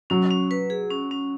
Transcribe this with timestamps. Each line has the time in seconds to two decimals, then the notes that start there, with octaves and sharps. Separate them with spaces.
0.10 F#3 C#4
0.30 C#4
0.51 B4
0.70 G#4
0.91 C#4
1.11 C#4